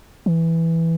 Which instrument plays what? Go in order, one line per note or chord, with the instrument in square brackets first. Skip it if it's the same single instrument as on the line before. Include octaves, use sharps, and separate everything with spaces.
[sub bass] E3